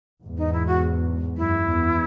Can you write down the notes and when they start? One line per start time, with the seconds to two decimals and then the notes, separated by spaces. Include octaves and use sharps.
0.24 E2 G#2
0.38 D#4
0.53 E4
0.67 F#4
1.37 F#2 E4
1.67 E2